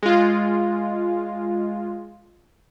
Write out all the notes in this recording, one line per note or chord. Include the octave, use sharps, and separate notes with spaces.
G#3 F4